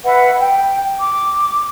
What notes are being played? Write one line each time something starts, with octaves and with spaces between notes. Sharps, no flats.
B4 E5 F#5
G5
D6